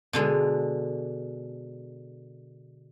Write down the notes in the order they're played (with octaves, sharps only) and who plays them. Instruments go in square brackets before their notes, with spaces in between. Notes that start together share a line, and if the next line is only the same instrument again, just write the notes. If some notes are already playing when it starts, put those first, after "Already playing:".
[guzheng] B2 D3 G#3